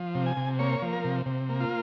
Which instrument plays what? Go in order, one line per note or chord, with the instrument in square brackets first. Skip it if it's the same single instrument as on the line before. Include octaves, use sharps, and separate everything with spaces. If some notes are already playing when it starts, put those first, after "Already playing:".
Already playing: [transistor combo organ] F3
C3
G#5
C3
A#3 C#5
F3
A#4
C3
C3
A#3
F4